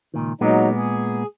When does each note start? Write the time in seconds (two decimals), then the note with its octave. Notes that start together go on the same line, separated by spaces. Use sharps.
0.14 C#2 A#2 D#3
0.41 A#2 F#3 G#3 B3 D#4
0.75 G#4